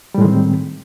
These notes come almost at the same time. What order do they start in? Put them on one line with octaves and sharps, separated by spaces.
G3 A2 G#3 D#3 C4